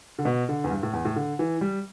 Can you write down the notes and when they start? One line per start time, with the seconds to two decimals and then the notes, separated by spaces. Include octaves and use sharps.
0.19 D3
0.25 B2
0.49 D3
0.64 E2
0.71 G2
0.83 A2
0.93 E2
1.05 A2
1.16 D3
1.39 E3
1.61 G3